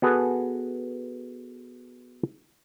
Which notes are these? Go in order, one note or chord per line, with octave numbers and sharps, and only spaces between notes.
B3 F#4 G#4 A4 B4